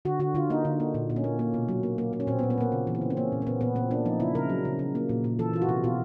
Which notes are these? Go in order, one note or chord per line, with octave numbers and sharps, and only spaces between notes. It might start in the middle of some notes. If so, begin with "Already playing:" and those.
D3 F#4
D3 F#4
D3 F4
A#3 D#4
D3
A#3
A#2
A#2
C#4
A#3
A#3
B2
F#3
A#3
A#3
A#3
C#4
A#2 C4
B3
A#2
B3
A#2 A#3
C#3
E3
C4
C#3
C4
A#3 C#4
A#2
A#3
A#2 B3
A#2 B3
A#2 C4
A#3 D4
F3 D#4
C#3 E4
C#3 A#4
F#3
C#3
C#3
A#3
A#2
A#2
E3 A4
E3 F4
F#4
C3
B2 F4